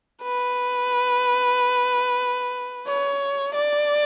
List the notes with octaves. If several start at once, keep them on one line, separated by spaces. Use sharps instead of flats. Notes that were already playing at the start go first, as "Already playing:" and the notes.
B4
C#5
D5